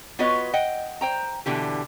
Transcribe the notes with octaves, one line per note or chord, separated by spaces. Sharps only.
B3 F4 F#4 B4 C#5 D#5
D#5 F#5 G5
C5 G5 A#5
B2 D3 E3 G4